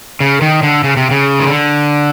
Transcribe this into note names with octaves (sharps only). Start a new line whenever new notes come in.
C#3
D#3
D3
C#3
C3
C#3
D#3
D3